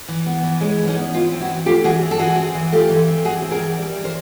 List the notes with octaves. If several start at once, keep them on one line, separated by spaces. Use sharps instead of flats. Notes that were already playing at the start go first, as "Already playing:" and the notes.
E3
B3
E3
G#3 C#4
E3
C#4 D#4
B3
E3 D#4 F4
C4
E4 F#4
E3
A3 F4 G4
E3 F#4 G#4
C4
A4
E3 F#4 G#4
C4
E3
A3 F4 G4
E3
C4
E3 F#4 G#4
C4
G#4 A#4
E3
G3
E3
A#4 C5